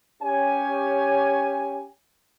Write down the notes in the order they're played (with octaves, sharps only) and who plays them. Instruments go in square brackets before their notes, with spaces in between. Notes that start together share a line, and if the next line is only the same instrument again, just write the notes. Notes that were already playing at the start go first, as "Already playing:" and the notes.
[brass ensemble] C#4 G4 C#5 G#5